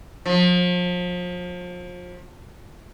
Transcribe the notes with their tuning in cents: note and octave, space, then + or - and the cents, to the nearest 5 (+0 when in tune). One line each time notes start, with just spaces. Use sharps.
F3 +35